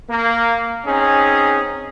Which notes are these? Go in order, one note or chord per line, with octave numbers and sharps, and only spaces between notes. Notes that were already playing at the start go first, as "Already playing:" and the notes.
A#3
C4 C#4 D#4 G#4